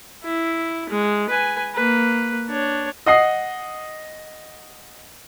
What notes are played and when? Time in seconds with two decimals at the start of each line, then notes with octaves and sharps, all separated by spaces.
0.23 E4
0.89 G#3
1.29 B4 G#5
1.75 A#3 B4
2.48 D4 C#5
3.06 D#5 F#5 D#6 C7